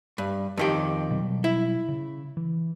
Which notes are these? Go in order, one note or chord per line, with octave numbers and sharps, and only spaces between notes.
G2
F2 D#3 G4
B2 F#3 G3
E4
C#3
E3